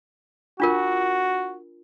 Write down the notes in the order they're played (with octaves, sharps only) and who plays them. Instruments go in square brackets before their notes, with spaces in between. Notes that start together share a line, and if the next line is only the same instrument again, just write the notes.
[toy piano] D4 F4 A#4 [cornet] F#4